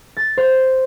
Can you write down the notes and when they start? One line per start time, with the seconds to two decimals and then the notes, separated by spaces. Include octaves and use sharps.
0.17 A6
0.37 C5